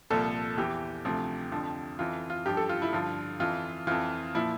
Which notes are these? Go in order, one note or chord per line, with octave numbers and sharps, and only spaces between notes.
C2 A#2 F3 A4
E2 E3 G4
D2 C3 F3
F2 D3 F3
F2 E3 F4
F4
G2 F3 G4
A4
F4
E4
G2 D3 F3 F4
F2 E3 F4
F2 E3 F4
A#2 F3 E4